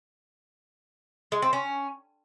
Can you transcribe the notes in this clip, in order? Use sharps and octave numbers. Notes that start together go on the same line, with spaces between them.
G#3
C4
C#4